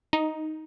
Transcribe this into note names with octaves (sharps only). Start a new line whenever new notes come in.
D#4